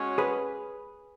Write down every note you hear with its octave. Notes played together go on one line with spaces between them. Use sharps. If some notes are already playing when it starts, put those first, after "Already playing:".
Already playing: G#3 C#4 F#4 C#5
G#4 B4